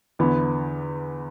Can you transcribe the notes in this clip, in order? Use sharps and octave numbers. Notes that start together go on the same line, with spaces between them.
E2 D3 B3 E4